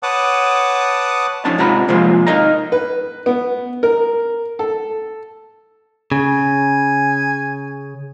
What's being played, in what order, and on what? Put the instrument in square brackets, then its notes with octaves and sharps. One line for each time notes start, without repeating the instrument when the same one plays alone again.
[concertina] B4 C#5 F#5 A5 D6 D#6
[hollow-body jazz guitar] F2 C#4 D#4 A5
G#2 C3 F4 F#5 A#5 B5
C3 F3 G#3 A#3 F4
D#4 A#4 D#5 F5 A#5
[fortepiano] B4
B3
A#4
A4
[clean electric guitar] C#3 [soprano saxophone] G#5